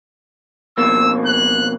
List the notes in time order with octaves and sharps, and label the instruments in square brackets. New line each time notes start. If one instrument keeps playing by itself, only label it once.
[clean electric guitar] F2 B2 A#3 [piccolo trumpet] E6
[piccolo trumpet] F#6